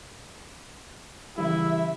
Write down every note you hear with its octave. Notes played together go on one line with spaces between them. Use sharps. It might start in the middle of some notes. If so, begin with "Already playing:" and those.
C#3 E3 G3 E4 E5